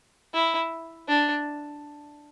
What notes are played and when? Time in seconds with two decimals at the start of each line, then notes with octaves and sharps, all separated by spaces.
0.34 E4
1.08 D4